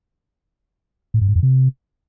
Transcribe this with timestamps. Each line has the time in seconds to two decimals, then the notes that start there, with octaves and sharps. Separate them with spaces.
1.14 A2
1.21 G2
1.28 G#2
1.36 F2
1.43 C3